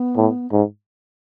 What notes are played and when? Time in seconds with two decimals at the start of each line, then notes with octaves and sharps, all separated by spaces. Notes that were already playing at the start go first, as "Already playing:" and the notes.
Already playing: B3
0.17 A2
0.52 G#2